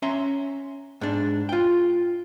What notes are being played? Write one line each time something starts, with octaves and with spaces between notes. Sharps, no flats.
C#4 E5 A#5 C6
G#2 D4
F4 G5